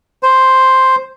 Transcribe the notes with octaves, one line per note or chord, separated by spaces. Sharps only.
C5